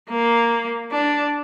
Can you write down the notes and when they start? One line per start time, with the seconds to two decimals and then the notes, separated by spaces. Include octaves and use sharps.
0.10 A#3
0.91 D4